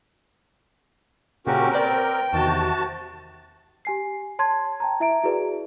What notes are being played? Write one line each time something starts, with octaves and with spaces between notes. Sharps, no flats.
A#2 C#3 A#3 C4 C#4 F#4 G4 A#4
B4 C5 D5 G5
E2 C3 D#3 F#4 A5
G4 G#5 C7
C#5 A5 C6 G#6
G5 A5 A#5
E4 E5 A#5 D7
E4 F#4 G#4 B4 D5